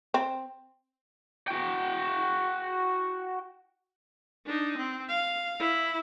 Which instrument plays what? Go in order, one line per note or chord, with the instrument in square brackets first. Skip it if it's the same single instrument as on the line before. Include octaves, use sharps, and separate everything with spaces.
[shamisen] C4
[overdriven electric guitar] F#4 G5
[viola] D4 D#4
C4
F5
E4